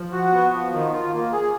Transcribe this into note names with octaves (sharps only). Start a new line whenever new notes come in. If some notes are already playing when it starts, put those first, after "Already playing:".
Already playing: F3
F#4
B3
F3
D#3
F4
A#3
G#4